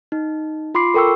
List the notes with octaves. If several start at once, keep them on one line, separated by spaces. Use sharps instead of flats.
D#4
F4 B5 C6 D6 C7
A4 A#4 G5 C#6 E6